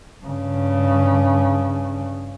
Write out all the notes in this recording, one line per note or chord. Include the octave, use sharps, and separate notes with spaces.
G2 C#3